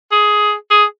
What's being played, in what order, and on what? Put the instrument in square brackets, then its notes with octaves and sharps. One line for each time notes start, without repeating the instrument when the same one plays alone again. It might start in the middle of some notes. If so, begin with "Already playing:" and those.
[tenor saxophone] G#4
G#4